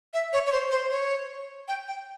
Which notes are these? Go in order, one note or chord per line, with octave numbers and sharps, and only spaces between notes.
E5
C#5
C#5
C5
C5
C#5
G5
G5